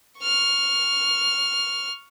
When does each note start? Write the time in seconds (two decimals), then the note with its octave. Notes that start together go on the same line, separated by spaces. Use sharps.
0.20 C#6 F6